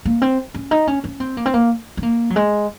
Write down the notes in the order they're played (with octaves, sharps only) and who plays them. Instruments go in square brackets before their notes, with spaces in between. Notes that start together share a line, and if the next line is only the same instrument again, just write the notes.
[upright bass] A#3
C4
C#4
D#4
C#4
C#4
C4
A#3
C4
A#3
C4
A#3
F#3
G#3